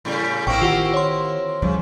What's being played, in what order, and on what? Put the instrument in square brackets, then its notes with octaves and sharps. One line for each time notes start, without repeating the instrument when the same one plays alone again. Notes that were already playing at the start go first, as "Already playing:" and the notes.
[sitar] A2 C#3 G3
[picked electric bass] A1 [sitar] A#3 C4 E4 [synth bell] G5 C#6
[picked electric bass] D#3 [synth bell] F4 G4 F#5
[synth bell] C#5 C6
[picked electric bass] D2 F3 G3 [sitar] C#3